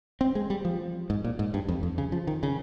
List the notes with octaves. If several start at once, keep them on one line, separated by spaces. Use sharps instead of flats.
C4
G#3
G3
F3
G#2
A#2
G#2
G2
F2
F2
C#3
F3
D#3
C#3